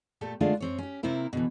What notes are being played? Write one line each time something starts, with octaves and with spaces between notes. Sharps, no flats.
A#2 A3 G4 A4
D3 G#3 A3 D4 F4
F#2 C4 C#5
C#4 G4
C3 A#3 C4 E4 A#4
B2 D3 E3